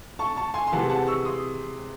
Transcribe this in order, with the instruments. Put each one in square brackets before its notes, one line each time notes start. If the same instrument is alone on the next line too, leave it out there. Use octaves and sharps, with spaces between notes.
[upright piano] A5 C#6
A5 C#6
G#5 C6
C6
C3 E3 G#3 F#5 A5
F#5 A5
C#6 E6
C6 D#6